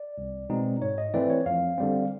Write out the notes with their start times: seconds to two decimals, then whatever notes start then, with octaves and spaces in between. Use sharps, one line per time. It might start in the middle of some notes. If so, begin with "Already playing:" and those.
Already playing: D5
0.18 C2
0.49 B2 G#3 C4 D#4
0.82 G#2 C#5
0.98 D#5
1.14 E3 A3 C4 D5
1.30 C#5
1.46 F2 F5
1.78 D3 G3 C4